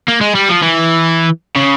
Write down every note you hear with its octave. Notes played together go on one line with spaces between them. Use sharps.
A#3
G#3
G3
F3
E3
C#3